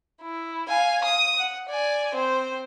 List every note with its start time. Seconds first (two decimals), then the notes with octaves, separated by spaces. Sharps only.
0.22 E4
0.68 F5 G#5
1.04 D#6
1.38 F#5
1.69 D5 G#5
2.15 C4 C5